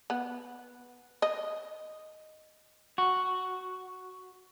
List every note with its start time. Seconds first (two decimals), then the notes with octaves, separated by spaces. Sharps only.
0.10 B3
1.22 D#5
2.98 F#4